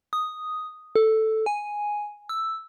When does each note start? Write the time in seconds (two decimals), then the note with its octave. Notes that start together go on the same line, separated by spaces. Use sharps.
0.13 D#6
0.96 A4
1.46 G#5
2.29 E6